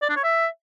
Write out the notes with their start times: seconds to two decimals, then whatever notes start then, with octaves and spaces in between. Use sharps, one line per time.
0.02 D5
0.09 D4
0.17 C#5
0.24 E5